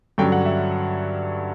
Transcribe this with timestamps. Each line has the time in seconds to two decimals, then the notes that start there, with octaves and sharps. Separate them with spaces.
0.18 G2 D3 F#3 C#4 G5
0.32 F#5
0.46 E5